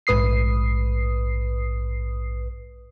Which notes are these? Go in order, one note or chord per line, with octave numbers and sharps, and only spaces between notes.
A#1 G#2 B4 D#6 C7